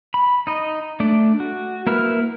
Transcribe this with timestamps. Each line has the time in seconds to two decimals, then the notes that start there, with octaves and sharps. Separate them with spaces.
0.14 B5
0.47 D#4 D#5
1.00 A3 D4 D5
1.40 F#4
1.87 A#3 E4 A#4 B4 F6